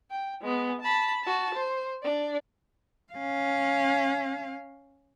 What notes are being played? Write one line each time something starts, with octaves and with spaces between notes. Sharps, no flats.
G5
G#3 B3
A5 B5
F#4 A5
C5
D4 D5
C#4 F5